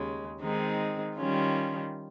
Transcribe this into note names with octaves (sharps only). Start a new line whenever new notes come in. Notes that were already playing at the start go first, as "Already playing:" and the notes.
Already playing: D#2 C#3 G#3
D#3 G#3 C4 D#4
D#3 G3 C#4 F4